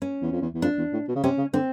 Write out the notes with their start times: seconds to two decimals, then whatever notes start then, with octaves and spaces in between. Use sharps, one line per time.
0.02 C#4
0.22 E2
0.32 F2
0.42 E2
0.54 E2
0.62 F2 D4
0.78 E2
0.93 A2
1.08 B2
1.16 C#3
1.24 C3 C#4
1.38 C#3
1.53 D3 C4